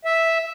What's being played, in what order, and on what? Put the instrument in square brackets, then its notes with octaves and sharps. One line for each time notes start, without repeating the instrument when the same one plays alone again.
[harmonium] E5